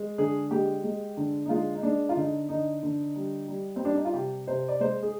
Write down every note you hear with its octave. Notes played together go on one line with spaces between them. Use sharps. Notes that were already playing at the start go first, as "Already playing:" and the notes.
Already playing: G#3
D3 G#4
G#3 G4
G#3
D3
D#4
G#3 F4
D#4
G#3 D4
F4
D3 D#4
D3 D#4
D3
G3
G3
C4
G3 D4
D#4
F4
C3 G4
C3 C5
D5
G#3 C5
G#4